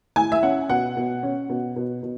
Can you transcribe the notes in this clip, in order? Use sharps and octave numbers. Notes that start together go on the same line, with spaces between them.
A2 G#5
E5
C#4 F#5
B2 F#5
B2
C#4
B2
B2
B2